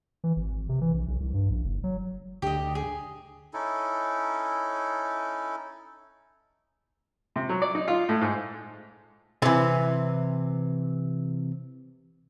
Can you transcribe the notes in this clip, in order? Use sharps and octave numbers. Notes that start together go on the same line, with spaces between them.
E3
G#1
G#1
C3
E3
A#1
B1
C2
G2
A#1
F#1
F#3
D2 G4 D#5
G#4
C#4 D#4 E4 A4
C3
F#3
D5
D#4
F4
A2
G#2
C3 E3